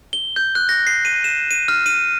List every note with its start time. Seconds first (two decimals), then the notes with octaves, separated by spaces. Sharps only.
0.13 G7
0.36 G6
0.55 F#6
0.69 A#6
0.87 C7
1.05 D#7
1.24 E7
1.51 D#7
1.68 F6
1.86 D#7